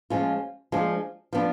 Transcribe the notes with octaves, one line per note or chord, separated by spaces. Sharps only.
F3 G#3 C#4 F4
F3 G#3 D4
F3 B3 D4